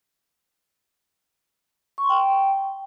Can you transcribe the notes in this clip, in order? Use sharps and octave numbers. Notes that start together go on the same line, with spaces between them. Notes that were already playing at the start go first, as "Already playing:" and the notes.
C#6
C6
G5